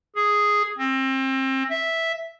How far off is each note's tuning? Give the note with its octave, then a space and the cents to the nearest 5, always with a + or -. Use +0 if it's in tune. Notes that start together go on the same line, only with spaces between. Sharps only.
G#4 +0
C4 +30
E5 -5